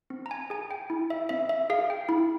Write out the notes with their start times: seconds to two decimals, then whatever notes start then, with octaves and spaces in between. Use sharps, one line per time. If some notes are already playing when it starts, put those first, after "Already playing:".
0.10 C4
0.26 A#5
0.31 G#5
0.50 G#4 G#5
0.71 G5
0.90 E4
1.10 E5
1.29 C4 E5
1.49 E5
1.70 G#4 F5
1.90 G5
2.09 E4